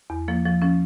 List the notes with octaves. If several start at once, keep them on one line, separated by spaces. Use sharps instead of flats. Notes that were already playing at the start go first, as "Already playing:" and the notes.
E2
F3 A#3
F3
F3 C#4